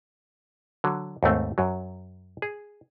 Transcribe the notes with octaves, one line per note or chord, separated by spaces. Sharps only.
D3 F#3
D#2 G#2 A3 C4
F#2 F#3
G#4